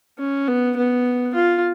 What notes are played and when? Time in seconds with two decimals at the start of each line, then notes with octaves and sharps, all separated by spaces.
0.19 C#4
0.48 B3
0.77 B3
1.35 F4